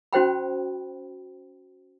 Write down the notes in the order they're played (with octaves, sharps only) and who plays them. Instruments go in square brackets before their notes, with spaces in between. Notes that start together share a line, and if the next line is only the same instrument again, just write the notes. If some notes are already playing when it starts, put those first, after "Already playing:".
[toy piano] C#4 F#4 C5 G5 B5